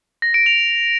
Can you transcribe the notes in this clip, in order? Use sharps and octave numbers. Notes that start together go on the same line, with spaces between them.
A#6
D7
F7